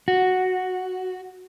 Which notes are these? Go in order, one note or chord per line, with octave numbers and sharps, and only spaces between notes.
F#4